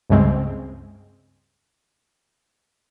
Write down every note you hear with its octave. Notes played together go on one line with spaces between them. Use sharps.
C#2 G2 C#3 G#3 C4